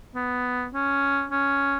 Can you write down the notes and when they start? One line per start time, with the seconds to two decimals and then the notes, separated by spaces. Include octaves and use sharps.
0.15 B3
0.74 C#4
1.32 C#4